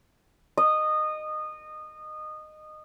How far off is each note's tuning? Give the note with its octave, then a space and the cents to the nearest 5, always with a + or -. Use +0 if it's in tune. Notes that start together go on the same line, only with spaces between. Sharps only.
D#5 -20